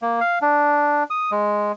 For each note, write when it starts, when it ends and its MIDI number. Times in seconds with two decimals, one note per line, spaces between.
0.02 0.20 58
0.21 0.39 77
0.42 1.03 62
1.10 1.31 87
1.31 1.72 56